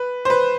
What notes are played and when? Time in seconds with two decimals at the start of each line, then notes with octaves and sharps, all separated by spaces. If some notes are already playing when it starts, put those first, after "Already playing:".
Already playing: B4
0.25 C5
0.30 B4